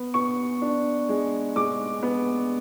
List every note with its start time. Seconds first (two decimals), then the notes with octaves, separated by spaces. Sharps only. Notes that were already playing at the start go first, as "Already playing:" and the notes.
Already playing: B3
0.14 B3 C#6
0.62 D4
1.09 G#3
1.56 G#3 D6
2.03 B3